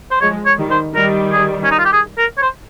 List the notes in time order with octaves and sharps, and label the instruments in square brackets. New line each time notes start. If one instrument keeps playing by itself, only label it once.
[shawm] C5
[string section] F3 G#3 [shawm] C#5
[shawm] C#5
[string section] D#3 G3
[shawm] C5
[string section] D#3 G3 [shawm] A#4
[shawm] G#4
C#4
D#4
F4
G4
G#4
A#4
C#5
C5